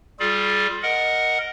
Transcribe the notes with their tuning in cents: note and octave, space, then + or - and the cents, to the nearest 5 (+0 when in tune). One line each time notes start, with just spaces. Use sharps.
G3 +0 F4 +15 G#4 +35
A#4 +0 D#5 +0 F#5 +0